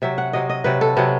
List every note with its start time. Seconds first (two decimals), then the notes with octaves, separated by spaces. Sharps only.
0.02 C3 F#3 E5
0.18 F#5
0.33 C3 F#3 D#5
0.49 D#5
0.64 C3 F#3 B4
0.81 A4
0.97 C3 F#3 B3